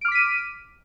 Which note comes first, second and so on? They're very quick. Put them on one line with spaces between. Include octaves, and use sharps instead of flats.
D7 F6 D6 B6 D#7